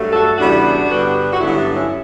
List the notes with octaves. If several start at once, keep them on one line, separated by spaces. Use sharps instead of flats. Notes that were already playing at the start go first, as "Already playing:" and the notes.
Already playing: G2 F#3 A3
F#4 A4
E2 C#3 G3 B3 D4 F#4
G2 D3 G3 B3
F#4
G2 D3 F#3 B3 C#4 E4
D4
C#4 E4